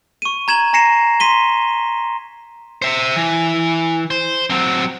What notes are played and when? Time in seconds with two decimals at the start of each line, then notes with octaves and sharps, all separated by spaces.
0.22 C#6 D#7
0.48 A#5 G#6 E7 F#7
0.73 G#5 A#5 A#6 C7 C#7 E7
1.20 C6 B6 D#7 G7
2.82 C5 E5
3.16 E3
4.11 C5
4.50 F#3 C4